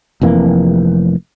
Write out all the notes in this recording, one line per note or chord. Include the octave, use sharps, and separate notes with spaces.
F1 F2 E3 A#3